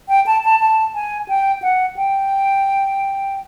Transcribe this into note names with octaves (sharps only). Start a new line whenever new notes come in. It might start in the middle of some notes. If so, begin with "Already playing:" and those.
G5
A5
A5
A5
G#5
G5
F#5
G5